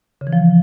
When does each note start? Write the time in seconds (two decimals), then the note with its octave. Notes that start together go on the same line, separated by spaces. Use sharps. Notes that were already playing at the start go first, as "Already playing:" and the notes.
0.21 C#3
0.27 E3
0.33 F3